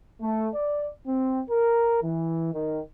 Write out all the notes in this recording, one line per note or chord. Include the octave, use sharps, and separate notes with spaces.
A3
D5
C4
A#4
E3
D#3